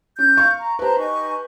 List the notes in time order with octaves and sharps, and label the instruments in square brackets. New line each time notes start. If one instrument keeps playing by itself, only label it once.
[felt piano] C#4 [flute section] G6
[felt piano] F5 C#6
[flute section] A#5
[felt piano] G4 B4 [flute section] C5 A5 A#5
[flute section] D#4 G#5 C#6